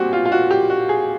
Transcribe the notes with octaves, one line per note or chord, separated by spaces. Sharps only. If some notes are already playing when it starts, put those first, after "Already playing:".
Already playing: A#2 G3 C4 F#4 G4
F4
F4
F#4
G4
F#4
G#4